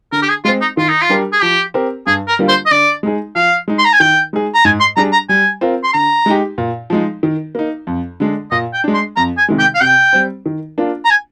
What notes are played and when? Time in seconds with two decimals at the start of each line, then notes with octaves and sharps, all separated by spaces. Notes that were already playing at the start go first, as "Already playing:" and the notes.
0.12 D3 A#4
0.23 G4
0.29 G#4
0.45 G#3 F4
0.48 C4
0.61 D#4
0.77 D#3 F4
0.89 D#4
1.02 F4
1.09 G3 D4 G4 A#4
1.33 G#4
1.42 F3 G4
1.74 C4 G4 A#4
2.07 G2 G#4
2.28 A#4
2.39 D3 G3 A#3 F4
2.49 C5
2.66 D#5
2.71 D3 D5
3.03 G#3 D#4 G#4
3.35 F3 F5
3.68 G#3 D#4
3.79 C6
3.85 A#5
3.93 G#5
4.00 D#3 G5
4.33 G#3 D#4 G#4
4.54 A#5
4.65 G#2 G#5
4.80 C6
4.96 G3 D4 G#4 A#5
5.13 A#5
5.29 G3 G#5
5.61 C4 F4 A#4
5.84 C6
5.93 D3 A#5
6.26 G#3 D#4 G4
6.58 A#2
6.90 F3 G#3 D#4
7.23 D#3
7.55 A#3 D#4
7.87 F2
8.20 D3 G#3 D4
8.51 A#2 D#5
8.74 G5
8.84 G#3 D4
8.94 C6
9.16 F2 A#5
9.38 G#5
9.48 C3 D#3 G#3
9.59 G5
9.75 F5
9.81 C3 G5
10.13 G3 C4
10.46 D#3
10.78 A#3 D4 F4
11.05 A#5
11.10 G#5